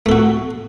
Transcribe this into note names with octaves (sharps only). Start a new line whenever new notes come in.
A3 F#4 A4